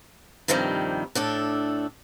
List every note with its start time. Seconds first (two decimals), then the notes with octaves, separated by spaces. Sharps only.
0.48 G2 C3 D#3 F3 G3
1.15 A2 D4 A4